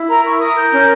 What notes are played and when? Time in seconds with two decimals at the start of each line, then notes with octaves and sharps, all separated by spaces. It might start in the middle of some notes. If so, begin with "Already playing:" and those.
Already playing: E4
0.09 A#4 A#5
0.24 C#6
0.40 A#4 D#6
0.57 G6
0.71 C#4 G6